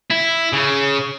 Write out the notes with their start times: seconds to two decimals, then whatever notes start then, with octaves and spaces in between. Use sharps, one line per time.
0.11 E4
0.53 C#3